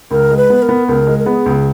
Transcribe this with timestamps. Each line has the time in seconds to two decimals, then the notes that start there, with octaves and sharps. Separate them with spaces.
0.11 C#2 A#4
0.30 G#3
0.37 B4
0.50 B3
0.62 A#4
0.69 B3
0.88 C#2 A#4
1.07 G#3
1.19 A#4
1.26 B3 G#4
1.46 C#2